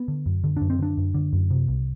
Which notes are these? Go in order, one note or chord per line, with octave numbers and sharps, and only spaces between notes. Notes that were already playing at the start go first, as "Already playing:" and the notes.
Already playing: B3
D3
F#2
D3
F#2 D4
C4
D3 D4
F#2
D3
F#2
C3
C2